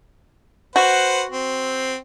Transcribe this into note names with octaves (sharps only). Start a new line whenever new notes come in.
F#4 B4 C5 F#5
C4